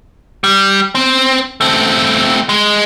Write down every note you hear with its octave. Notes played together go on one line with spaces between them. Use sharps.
G3
C4
A3 C4
G#3